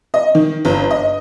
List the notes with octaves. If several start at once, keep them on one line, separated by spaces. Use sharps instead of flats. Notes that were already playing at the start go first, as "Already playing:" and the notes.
D#5
D#3
G1
D#5